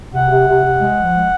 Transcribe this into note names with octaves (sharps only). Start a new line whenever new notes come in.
C3 F#5
C3
C3
C3
G#3
F3
G#3